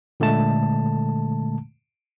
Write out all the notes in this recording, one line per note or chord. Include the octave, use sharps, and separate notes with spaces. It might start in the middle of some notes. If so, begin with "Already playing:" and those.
A#2 D3 G#3 A3 A5